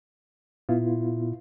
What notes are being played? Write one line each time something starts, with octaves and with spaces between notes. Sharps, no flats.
A#2 B3 E4 F4